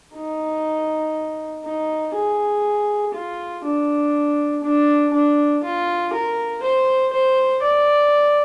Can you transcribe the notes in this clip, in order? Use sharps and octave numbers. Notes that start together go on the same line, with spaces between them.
D#4
D#4
G#4
F4
D4
D4
D4
F4
A#4
C5
C5
D5